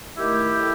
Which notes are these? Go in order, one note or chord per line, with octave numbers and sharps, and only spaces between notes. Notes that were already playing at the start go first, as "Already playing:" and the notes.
D#3 A3 E4 G4
A2